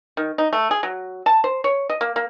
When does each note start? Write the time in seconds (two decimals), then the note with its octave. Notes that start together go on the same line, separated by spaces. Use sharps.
0.17 D#3
0.38 D#4
0.53 A3
0.71 G#4
0.83 F#3
1.26 A5
1.44 C5
1.64 C#5
1.89 D#5
2.01 A#3
2.16 A#3